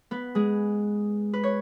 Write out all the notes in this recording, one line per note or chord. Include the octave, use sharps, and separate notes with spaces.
B3 B4
G#3 G#4
B4
C#5